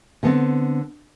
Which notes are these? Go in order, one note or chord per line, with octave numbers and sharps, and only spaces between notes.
D3 B3 C4